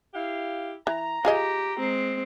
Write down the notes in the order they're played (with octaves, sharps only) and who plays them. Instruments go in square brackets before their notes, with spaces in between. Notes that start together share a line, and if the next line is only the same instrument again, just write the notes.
[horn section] E4 G4 F5
[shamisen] E3 [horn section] A#5
[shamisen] F4 G#4 D#5 [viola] G4
[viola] G#3 C4